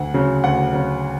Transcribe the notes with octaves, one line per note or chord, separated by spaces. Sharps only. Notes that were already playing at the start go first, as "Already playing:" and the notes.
Already playing: D2 F#5
C#3 F#3
D2 F#5
C#3 F#3